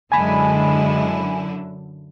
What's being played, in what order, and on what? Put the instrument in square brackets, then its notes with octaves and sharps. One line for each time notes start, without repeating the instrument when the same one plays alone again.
[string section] F#2 D3 E4 [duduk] G#3 [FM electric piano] G#5 B5